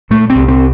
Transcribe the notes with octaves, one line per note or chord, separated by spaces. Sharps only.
A#2 A3
C4
C2
C4